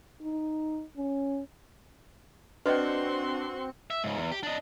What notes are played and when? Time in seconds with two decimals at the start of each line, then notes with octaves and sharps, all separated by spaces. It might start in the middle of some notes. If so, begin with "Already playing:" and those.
0.22 D#4
0.97 C#4
2.66 C4 D4 F#4 B4 D#5 C6 C#7
3.90 E5
4.04 C#2 G#2
4.17 E2
4.32 G4
4.43 D4 D#5